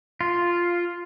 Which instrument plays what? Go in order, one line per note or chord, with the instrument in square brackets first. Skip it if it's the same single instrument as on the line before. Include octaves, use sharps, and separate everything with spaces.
[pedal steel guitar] F4